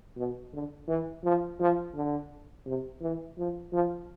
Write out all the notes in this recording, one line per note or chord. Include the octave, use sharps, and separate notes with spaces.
B2
D3
E3
F3
F3
D3
C3
E3
F3
F3